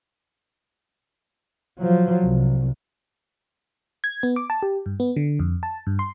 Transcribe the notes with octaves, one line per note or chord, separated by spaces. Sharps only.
F3 F#3
C2
G#6
B3
D6
A5
G4
G2
B3
D3
F2
A5
G2
C6